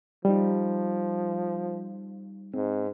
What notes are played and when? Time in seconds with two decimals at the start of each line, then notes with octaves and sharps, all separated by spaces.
0.25 F3 G3 D#4
2.54 G#2 C4